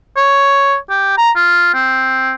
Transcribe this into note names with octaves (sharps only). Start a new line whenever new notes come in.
C#5
G4
A#5
F4
C4